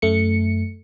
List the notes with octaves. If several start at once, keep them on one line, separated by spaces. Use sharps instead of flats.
F#2 A3 C#7